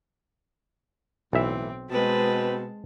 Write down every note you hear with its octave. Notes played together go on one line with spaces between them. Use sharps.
B1 A2 E3 C4 E5
B2 G#3 C4 B4 A5